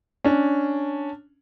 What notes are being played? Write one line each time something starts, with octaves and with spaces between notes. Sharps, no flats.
C#4 D4